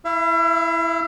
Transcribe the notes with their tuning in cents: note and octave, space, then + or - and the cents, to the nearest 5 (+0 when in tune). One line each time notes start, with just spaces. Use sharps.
E4 +0 E5 +45